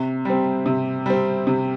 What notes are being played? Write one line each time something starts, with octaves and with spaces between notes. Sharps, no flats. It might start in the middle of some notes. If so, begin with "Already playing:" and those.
Already playing: C3
G3 C4
C3
G3 C4
C3